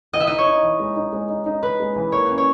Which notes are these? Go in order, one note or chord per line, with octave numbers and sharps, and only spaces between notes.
E3 D#5
E5
D#4 D#5
C#5
D#4
E3
G#3
D#4
G#3
D#4
D#4
D#4 B4
G#3
E3
A#3 C#5
C#4
C#5